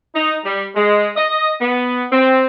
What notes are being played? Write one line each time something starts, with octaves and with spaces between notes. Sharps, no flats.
D#4
G3
G#3
D#5
B3
C4